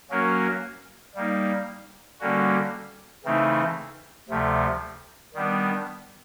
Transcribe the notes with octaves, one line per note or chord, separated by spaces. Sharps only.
F#3 A#3 C#4 F#4 A#4
G3 A#3 D#4
D3 G3 A#3 C#4 F#4
C#3 E3 A3 C4 D#4
D2 C3 F3 A3
D#3 G3 B3 D4